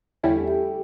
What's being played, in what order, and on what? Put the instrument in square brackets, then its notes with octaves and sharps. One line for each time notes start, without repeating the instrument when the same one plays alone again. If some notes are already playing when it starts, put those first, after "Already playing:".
[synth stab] E2 D3 G3 C#4 E4 [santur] A3
[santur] G4